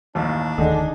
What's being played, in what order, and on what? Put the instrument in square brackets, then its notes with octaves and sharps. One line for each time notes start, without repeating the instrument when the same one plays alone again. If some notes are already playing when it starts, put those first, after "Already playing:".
[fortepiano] A1 D#2 [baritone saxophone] D4
[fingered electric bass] F1 D#2 A3 [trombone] D3 [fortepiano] D#4 G#4